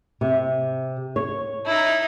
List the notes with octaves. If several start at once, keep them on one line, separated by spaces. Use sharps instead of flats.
C3
C#5
D#4 E4